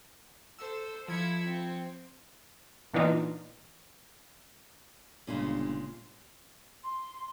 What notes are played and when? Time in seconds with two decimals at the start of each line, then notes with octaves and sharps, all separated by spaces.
0.58 A4 C5 E6
1.08 F3 E4 E5 G#6 C#7
1.45 C4
2.94 A#2 E3 B3 D4 D#4 F4
5.27 G1 A#2 C#3 G#3
6.83 C6